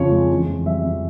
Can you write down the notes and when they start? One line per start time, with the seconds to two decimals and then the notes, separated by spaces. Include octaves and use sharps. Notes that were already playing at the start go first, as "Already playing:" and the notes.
Already playing: F2 C#3 F3 C#5
0.11 G#3
0.29 E3
0.47 F2
0.66 G3 E5
0.84 F2